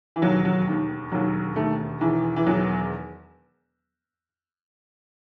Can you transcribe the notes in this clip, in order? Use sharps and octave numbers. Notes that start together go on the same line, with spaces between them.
E3
E1 D#2 D#3 F#3
F#3
E1 D#2 D#3
E1 D#2 D#3 F#3
E1 D#2 D#3 A3
E1 E2 D#3 E3
E3
E1 E2 D#3 F#3